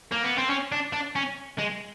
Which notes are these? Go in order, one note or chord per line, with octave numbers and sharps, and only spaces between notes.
A#3
B3
C4
C#4
D4
D4
C#4
G#3